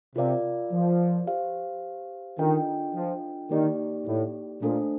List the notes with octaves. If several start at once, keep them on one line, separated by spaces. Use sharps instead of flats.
C3 F4 A#4 D5 F5
F3
G4 C5 F5
D#3 D4 F4 A4 D#5 G5
F3
D#3 A#3 D#4 G4 D5
A2
A#2 A3 D4 A4 C5